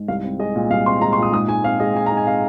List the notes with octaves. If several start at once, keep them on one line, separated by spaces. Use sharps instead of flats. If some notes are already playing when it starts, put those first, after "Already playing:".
Already playing: G#2
C2 F5
C4
G#3 D#5
A#2
C2 F5
C4 C6
G#3 A#5
C6
A#2
D#6
G#2 D#6
G#2 G#5
C4 F5
G#3 D#5
G#2 G#5
A#5
G#2
G#5
C4 F5